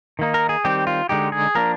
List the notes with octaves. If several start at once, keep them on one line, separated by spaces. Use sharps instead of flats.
D#3 A#3 D#4
A#4
G#4
D#3 G3 C4 G4
F4
D3 G#3 D#4 G4
G#4
F3 A#3 D4 A#4